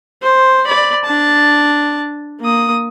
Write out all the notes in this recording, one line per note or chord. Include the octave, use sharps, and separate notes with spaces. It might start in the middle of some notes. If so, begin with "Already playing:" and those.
C5
D5 B5
D4 A5
A#3 D#6